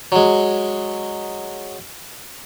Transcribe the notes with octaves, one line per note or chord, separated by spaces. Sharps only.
F#3 G#3